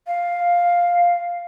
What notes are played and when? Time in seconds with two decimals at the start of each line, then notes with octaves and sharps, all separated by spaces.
0.07 F5